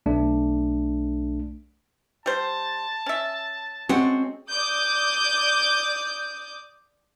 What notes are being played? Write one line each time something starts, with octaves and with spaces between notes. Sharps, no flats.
B1 A3 D4
G3 C5 A5
C#4 E5
G#3 C4 C#4 F#4
D5 D6 D#6 G6